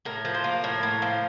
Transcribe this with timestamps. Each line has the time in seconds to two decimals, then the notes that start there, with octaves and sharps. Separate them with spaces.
0.05 A2 A#4
0.25 F3
0.34 C5
0.44 A#3
0.64 A2 A#4
0.83 A2
1.02 F3